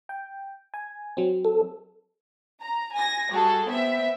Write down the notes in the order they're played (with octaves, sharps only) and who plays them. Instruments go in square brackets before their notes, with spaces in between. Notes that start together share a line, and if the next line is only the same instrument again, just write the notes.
[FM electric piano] G5
G#5
F#3 C4
[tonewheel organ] A4
[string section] A#5
G#5 A#6
G3 F#4 G#4 A4
B3 C4 E5